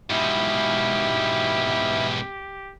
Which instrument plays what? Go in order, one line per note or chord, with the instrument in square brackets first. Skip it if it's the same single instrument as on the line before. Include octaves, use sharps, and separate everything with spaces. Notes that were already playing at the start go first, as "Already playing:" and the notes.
[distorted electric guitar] G#2 B2 [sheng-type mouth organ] E4 F5 [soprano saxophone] G4